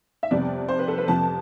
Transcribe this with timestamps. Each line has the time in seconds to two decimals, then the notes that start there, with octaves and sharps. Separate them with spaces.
0.23 E5
0.31 F2 C3 G3 B3 D5
0.69 C5
0.79 B4
0.88 A4
0.98 B4
1.08 F2 C3 F3 A5